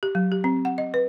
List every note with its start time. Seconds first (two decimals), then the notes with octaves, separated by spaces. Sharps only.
0.03 G4
0.15 F#3
0.32 G4
0.44 C4
0.65 F#5
0.78 D#5
0.94 B4